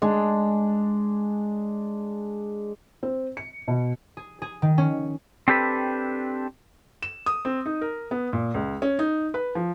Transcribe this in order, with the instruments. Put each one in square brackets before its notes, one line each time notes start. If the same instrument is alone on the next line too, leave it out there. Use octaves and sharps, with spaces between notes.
[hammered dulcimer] G#3 D4
[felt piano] C4
C#7
B2
[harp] G#4
G#4
D#3
C#4
[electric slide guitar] C4 D4 G4 A4 B4
[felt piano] E7
D#6
C4
D#4
A#4
B3
A#2
C#2
C#4
D#4
B4
F3